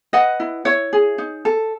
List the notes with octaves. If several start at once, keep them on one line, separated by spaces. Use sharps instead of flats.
B4 D#5 F#5
E4
E4 C#5
G#4
D#4
A4